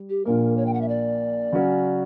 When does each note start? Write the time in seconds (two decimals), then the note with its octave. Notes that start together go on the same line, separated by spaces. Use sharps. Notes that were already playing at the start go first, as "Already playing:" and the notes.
Already playing: G3
0.09 G4
0.25 A#1 A#2 A#3 A#4
0.57 C#5
0.66 G5
0.73 F#5
0.81 E5
0.88 D5
1.53 C#3 F#3 C#4 F#4